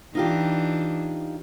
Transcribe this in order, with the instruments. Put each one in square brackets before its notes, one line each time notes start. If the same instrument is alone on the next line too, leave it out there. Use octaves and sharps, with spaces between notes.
[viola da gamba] E3 D4 [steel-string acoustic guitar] D#4 F4 G4